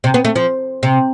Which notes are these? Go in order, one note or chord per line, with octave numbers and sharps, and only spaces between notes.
C3
B3
A3
F3
C3